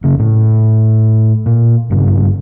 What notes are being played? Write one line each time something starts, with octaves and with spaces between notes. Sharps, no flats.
F#1 F#2 C#3
A2
A#2
F#1 G2 A#2 C#3